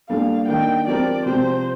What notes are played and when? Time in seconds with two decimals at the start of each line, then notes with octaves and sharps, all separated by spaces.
0.09 A#2 G3 D4 A4 F5
0.48 D#3 A#3 D4 G5
0.87 F3 C4 G4 A#4 D5
1.26 C3 F3 C4 G4 C5